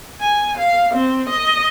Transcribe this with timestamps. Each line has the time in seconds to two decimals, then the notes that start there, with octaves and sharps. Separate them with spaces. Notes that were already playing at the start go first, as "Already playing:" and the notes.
0.21 G#5
0.58 F5
0.94 C4
1.29 D#5